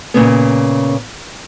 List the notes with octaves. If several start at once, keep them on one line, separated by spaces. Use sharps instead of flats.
A#2 C#3 B3